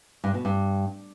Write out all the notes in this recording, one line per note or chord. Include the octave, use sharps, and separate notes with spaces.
G2
B2
G2